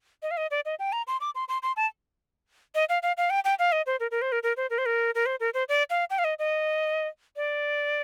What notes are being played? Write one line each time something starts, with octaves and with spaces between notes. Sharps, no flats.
D#5
F5
D#5
D5
D#5
G5
A#5
C6
D6
C6
C6
C6
A5
D#5
F5
F5
F5
G5
G5
F5
D#5
C5
A#4
A#4
C5
A#4
A#4
C5
A#4
C5
A#4
A#4
C5
A#4
C5
D5
F5
G5
F5
D#5
D#5
D5